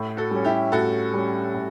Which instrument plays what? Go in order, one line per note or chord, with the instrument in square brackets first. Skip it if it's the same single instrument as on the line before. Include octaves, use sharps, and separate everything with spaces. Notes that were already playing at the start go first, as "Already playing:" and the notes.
Already playing: [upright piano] A2
[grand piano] F#4 A4
[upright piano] G3 C#4
[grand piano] E4 G4
[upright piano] A2 [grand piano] F#4 A4
[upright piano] G3 C#4
A2